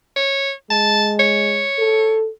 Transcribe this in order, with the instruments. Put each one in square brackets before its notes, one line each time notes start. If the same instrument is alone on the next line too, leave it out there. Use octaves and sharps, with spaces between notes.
[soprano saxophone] C#5
[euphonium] G#3 [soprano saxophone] A5
[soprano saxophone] C#5
[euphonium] A4